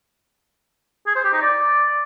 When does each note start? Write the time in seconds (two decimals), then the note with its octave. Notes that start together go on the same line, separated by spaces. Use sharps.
1.07 G#4
1.16 C5
1.24 G4
1.33 D#4
1.42 D5